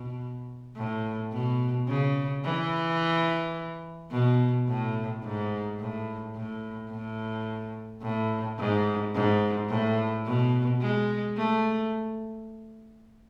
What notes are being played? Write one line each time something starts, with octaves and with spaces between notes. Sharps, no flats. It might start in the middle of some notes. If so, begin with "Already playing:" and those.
Already playing: B2
A2
B2
C#3
E3
B2
A2
G#2
A2
A2
A2
A2
G#2
G#2
A2
B2
G#3
A3